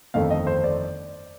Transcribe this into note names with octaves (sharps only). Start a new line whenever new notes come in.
G1 F2 D#3 A3 F5
D#5
C5
D5